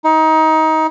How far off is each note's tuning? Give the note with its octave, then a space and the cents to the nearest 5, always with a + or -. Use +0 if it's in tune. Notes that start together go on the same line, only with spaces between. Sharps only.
D#4 +25